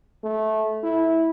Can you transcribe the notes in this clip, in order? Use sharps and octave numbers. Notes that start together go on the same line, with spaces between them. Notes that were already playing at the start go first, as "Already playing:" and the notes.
A3
E4